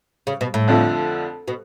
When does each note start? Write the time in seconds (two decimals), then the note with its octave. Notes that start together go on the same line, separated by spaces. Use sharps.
0.27 C#3
0.41 B2
0.54 A2
0.68 F2 D3 F3 A3
1.48 B2